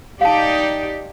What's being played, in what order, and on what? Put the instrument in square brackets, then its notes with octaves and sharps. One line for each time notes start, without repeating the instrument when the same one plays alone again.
[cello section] D#4 G4 D5 [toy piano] F5 A5